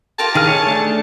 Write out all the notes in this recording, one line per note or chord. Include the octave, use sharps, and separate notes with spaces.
F4 G4 A#4 A5
D#3 G#4 F6
C#5
A3 D4